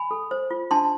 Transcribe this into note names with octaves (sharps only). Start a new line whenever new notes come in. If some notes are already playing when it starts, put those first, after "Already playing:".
Already playing: G#5 B5
A4
C5
F4
D4 A5 C6